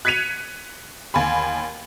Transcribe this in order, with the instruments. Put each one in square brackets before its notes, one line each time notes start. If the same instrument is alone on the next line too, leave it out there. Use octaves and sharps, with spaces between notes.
[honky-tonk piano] F#6 G#6 B6 C#7 D#7 F7
D#2 G#5 B5